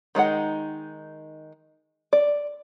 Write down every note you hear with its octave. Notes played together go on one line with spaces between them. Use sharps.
D#3 G#3 D#4 F#5
D5